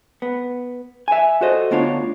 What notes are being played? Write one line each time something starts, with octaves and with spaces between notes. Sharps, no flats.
B3
E5 G#5
F#4 A4 C5 D#5
D2 B3 D4 F4 C#5